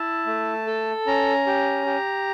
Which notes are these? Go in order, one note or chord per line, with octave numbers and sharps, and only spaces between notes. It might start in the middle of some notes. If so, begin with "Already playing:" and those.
Already playing: E4 A5
A3
A4
C#4 A#5
G4
G4